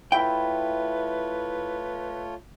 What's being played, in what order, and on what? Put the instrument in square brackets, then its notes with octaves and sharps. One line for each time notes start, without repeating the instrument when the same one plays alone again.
[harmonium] A3 F4 C#5 [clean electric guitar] E4 [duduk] B4 [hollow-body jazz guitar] G5